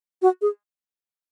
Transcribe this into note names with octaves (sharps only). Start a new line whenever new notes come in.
F#4
G#4